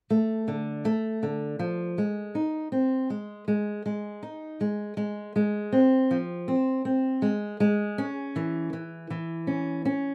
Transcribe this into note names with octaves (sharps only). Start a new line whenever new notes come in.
A3
D3
A3
D3
F3
G#3
D#4
C4
G#3
G#3
G#3
D#4
G#3
G#3
G#3
C4
F3
C4
C4
G#3
G#3
C#4
E3
E3
E3
C#4
C#4